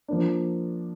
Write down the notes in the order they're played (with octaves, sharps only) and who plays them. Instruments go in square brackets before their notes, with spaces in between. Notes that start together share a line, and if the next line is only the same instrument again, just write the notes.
[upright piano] F3 A#3 D4